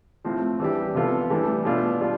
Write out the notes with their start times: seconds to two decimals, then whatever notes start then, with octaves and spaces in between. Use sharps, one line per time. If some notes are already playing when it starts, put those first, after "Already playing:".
0.24 A2 F3 C4
0.60 E3 G3 D4 G4
0.95 C3 F3 B3 F4 A4
1.30 A2 E3 G3 D4 A4
1.65 B2 A3 D4 F4
2.01 G3 D4 F4